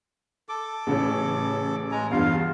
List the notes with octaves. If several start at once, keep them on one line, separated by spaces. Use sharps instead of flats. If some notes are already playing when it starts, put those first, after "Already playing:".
A4 D6
A1 C#3 C#5
G#3 G#5 A#5
E2 G2 F4 F5